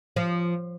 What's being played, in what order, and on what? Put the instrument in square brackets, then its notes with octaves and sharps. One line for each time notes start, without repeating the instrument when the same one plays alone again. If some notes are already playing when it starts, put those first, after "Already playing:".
[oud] F3